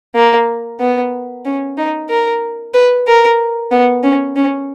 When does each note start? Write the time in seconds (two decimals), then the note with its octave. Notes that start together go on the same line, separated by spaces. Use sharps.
0.15 A#3
0.80 B3
1.45 C#4
1.77 D#4
2.09 A#4
2.74 B4
3.07 A#4
3.71 B3
4.03 C#4
4.36 C#4